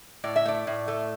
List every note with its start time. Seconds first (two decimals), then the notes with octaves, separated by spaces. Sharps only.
0.24 A2 D5
0.36 E5
0.46 A3 D5
0.67 A2
0.88 A3